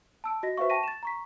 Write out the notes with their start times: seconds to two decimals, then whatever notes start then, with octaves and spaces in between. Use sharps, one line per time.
0.24 A5 E6 D7
0.43 F#4 D#5 A#6
0.57 F#4 B4 C5 E5 F5 C#6
0.70 G5 A5 C#6 A#6 B6 D#7
0.83 A6 E7
1.03 A#5 C#6 B6